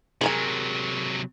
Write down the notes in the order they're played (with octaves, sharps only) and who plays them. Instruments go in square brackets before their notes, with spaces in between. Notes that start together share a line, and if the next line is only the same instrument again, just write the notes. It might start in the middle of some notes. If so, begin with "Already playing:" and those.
[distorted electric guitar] C3 F#3 [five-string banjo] G#4 A#4 G#5